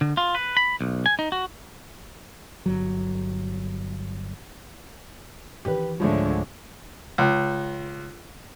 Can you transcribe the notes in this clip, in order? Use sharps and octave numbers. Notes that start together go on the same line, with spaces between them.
D3
F4
B4
B5
B1
G#5
D#4
F#4
G1 F#3
D#3 E3 G4 B4
C#2 G#2 D3 F3 G#3 A3 C#5
C#2